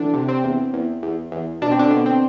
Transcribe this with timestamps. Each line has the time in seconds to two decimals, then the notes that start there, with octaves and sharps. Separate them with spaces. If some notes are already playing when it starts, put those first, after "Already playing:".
Already playing: E2 D3 D4
0.14 C3
0.28 C4
0.44 E2
0.73 E2
1.03 E2
1.32 E2
1.62 B2 D4
1.71 C4
1.79 D3 D4
1.91 B2
2.06 C4